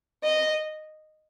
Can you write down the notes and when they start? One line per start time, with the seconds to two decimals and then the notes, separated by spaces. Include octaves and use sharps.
0.24 D#5